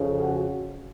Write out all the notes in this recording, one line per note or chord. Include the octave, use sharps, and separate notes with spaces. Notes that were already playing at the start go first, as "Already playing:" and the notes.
Already playing: F2 C#3
F#4